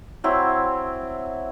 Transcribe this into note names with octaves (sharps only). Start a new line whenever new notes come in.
F#3 C4 E4